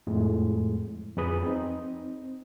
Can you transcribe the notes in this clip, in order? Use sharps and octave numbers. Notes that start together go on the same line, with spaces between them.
F2 A2 G#3
F2 G#4 B4 D#6
C4 D#4